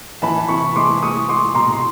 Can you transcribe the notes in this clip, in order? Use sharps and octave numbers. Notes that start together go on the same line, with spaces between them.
E3 A5 B5
C3 B5 C#6
G#3 C6 D6
G#3 C#6 D#6
G#3 C6 D6
B2 A#5 C6
C6